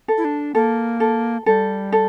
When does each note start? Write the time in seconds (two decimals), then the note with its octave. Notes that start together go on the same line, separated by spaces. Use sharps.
0.08 A4
0.18 E4
0.25 D4
0.55 A#3 A4
1.00 A4
1.46 G3 A4
1.92 A4